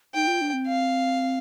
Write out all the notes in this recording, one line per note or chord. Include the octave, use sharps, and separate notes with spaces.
D#4 G5
F4
D4
C4
F5